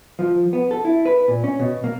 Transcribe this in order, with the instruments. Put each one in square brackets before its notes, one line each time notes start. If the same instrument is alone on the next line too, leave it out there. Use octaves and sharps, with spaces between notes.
[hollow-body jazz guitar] F3
B3
A4
E4
B4
A#2
C#4
B2
A#3